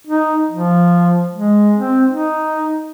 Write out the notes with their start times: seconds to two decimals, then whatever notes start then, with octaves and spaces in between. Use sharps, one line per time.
0.07 D#4
0.51 F3
1.33 G#3
1.77 C4
2.09 D#4